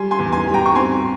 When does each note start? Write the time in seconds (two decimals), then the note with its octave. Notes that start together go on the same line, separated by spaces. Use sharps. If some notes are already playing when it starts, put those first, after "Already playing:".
Already playing: G3 G#5 C6
0.11 G#5 C6
0.19 E2
0.32 G#5 C6
0.47 G3
0.54 G5 A#5
0.66 C#6
0.75 C4 G#5 C6